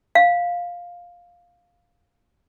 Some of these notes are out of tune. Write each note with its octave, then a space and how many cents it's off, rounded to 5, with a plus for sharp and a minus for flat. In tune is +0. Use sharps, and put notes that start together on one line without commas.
F5 +10